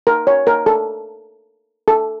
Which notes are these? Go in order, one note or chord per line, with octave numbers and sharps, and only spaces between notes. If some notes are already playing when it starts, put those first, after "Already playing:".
A#4
C#5
A#4
A4
A4